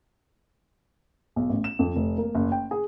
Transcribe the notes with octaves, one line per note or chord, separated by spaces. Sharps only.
B1
A1
E7
F2
F1
A#3
F#1
G5
G#4